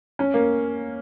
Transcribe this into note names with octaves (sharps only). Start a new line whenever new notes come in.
C#4
A#3